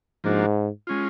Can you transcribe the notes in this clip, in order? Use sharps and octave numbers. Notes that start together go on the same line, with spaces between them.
G#2 F3 A#3 D4 F#4
G#3 C#4 F4